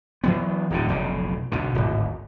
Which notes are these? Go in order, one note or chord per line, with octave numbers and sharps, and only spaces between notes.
E3 F#3 B3
D1 A2 D3
F1 B1 C#3
B1 B2 D3
D1 G#1